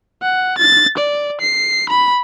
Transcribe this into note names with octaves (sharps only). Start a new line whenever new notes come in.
F#5
A6
D5
C7
B5